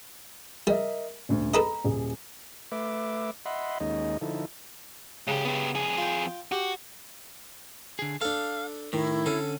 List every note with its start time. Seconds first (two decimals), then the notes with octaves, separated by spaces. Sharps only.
0.67 G3 A#4 D#5 E5
1.29 D#1 D2
1.54 A4 B4 D#5 A#5 B5
1.85 D#1 G#4
2.72 A3 B4 E5 D6
3.46 D#5 E5 F#5 B5 C6
3.80 D#2 G#3 A#3 C#4 D#4 D#5
4.21 D3 F3 D#4 E4 A4
5.27 G#2 C#3 G4
5.45 B3 G4
5.74 F2 G#4
5.98 F4 G5
6.52 F#4 G4
7.99 D3 G#4
8.21 D4 A4 F5
8.93 A2 D#3 E4
9.26 D3 C#4 A4